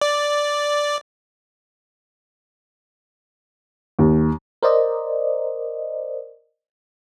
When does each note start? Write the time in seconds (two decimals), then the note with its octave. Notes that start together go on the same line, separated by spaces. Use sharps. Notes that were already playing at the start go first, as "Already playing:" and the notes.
0.01 D5
3.99 D#2
4.63 A#4 C5 D5 D#5